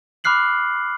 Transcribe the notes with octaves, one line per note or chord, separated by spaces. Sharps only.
B5 D6 F6 F#6 C7 F#7